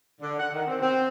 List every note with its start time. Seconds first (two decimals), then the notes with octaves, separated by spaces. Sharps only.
0.21 D3
0.40 F#5
0.53 D#3
0.68 C4
0.82 C4